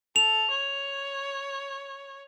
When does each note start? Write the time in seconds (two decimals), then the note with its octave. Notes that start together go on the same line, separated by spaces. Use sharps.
0.16 A4 F7
0.50 C#5